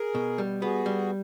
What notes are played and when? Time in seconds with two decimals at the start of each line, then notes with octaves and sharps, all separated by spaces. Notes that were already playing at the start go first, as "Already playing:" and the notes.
Already playing: G#4 A#4
0.15 B2
0.38 G3
0.61 B3 F#4 G#4
0.86 G3